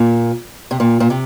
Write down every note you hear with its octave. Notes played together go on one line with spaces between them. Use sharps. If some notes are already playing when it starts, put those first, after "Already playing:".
Already playing: A#2
C3
A#2
A#2
C3